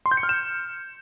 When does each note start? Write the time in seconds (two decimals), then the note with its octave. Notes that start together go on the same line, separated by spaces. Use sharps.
0.06 C6
0.11 G6
0.17 C#7
0.23 F6
0.29 E7